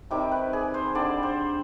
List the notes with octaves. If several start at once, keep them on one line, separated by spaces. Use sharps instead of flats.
C3 D#3 G3 G4
B4
G#4
C5
D3 G3 D5
C5